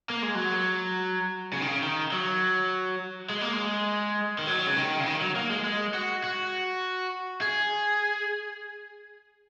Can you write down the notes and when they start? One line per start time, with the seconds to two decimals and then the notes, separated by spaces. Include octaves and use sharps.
0.10 A#3
0.22 G#3
0.35 F#3
1.53 C#3
1.61 D#3
1.68 C#3
1.83 D#3
2.12 F#3
3.30 G#3
3.41 A#3
3.53 G#3
4.39 D#3
4.47 F#3
4.67 C#3
4.77 D#3
5.00 C#3
5.06 D#3
5.21 F#3
5.36 A#3
5.50 G#3
5.64 G#3
5.94 F#4
6.24 F#4
7.42 G#4